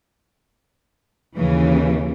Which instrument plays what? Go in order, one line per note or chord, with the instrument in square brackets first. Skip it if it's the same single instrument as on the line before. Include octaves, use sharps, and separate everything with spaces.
[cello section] D#2 C#3 E3